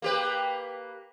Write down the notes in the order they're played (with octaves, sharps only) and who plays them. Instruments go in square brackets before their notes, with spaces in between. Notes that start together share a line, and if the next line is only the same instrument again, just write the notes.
[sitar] A#3 G4 B4